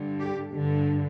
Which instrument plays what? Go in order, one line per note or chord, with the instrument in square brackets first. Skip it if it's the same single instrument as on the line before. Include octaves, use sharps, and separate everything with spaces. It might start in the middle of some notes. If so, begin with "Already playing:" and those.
Already playing: [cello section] G2 D3
G4
G2 D3